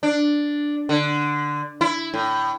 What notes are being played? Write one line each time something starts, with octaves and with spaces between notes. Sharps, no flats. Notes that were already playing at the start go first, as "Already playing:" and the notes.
D4
D3
E4
A2